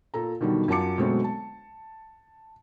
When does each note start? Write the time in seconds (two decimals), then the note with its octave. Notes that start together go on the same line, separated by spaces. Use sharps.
0.14 A#2 A4 A#5
0.40 B2 D3 D#3 F#3 G3
0.68 F#2 F4 F#4 A5 D6 C#7
0.98 B2 D3 F#3 G#3 A3 C4
1.24 A5